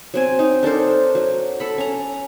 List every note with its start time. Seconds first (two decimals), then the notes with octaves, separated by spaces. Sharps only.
0.14 F#3 C4 G#5
0.39 D#4
0.63 D4 A4 A#4 C5
1.15 F#3
1.60 A4 B5
1.78 C#4 A#5